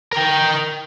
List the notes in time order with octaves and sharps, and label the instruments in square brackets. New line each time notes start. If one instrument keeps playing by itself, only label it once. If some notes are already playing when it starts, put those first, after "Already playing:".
[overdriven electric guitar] A#4 G5